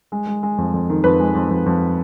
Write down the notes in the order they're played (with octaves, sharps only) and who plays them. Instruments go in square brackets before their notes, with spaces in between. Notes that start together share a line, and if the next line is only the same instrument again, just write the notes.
[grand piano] G#3
G#3
G#3
F2
F2
D#3
F2 B4
G#3
F2
F2
F2